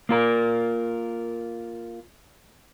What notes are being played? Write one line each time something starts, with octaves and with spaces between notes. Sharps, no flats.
A#3 F4 A#4